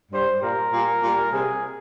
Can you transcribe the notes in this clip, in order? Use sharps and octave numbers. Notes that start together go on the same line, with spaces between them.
G2 G3 C5
A#2 G3 A#4
A#2 G3
A#2 G3
C3 G3 G#4